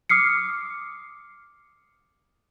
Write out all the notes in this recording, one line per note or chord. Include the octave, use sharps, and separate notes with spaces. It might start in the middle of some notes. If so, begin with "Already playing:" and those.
D6 D#6 F6 C7 C#7